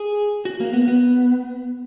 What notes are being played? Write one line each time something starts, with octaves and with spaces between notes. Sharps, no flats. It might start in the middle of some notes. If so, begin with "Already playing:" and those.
Already playing: G#4
F#4
A#3
B3
B3